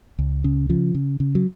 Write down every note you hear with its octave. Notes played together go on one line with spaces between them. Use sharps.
C#2
C#3
C#3 F3
C#3
C#3
F#3